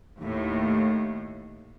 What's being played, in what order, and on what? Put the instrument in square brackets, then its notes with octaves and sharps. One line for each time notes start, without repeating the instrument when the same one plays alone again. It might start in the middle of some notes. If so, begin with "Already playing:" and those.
[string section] D#2 A2